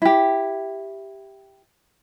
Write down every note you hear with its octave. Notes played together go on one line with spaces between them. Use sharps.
E4 G4